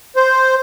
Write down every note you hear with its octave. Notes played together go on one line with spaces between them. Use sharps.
C5